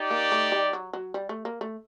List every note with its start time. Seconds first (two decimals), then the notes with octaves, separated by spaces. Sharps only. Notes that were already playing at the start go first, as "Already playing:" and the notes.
Already playing: D#4 G4 D5
0.11 A#3
0.32 A3
0.52 G3
0.73 F#3
0.93 F#3
1.14 G3
1.29 A3
1.45 A#3
1.61 A3